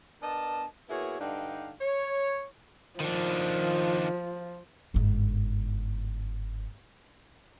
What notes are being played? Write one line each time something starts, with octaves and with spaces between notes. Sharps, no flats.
B3 D4 A#4 D#5 A5
A#3 B3 E4 F#4 G#4 C#5
G2 D3 D4 D#4 F5 G5
C#5
D#3 F3 D4
G1 G#2